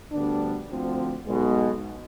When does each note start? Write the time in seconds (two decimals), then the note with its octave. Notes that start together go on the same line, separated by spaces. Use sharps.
0.12 D2 D3 G3 B3 D4
0.68 D2 D3 F3 C4
1.25 B1 B2 G#3